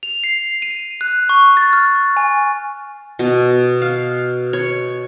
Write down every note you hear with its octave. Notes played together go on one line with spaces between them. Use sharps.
F7
C7
D#7
F#6
C#6
A6
F6
G#5
B2
F5
C#5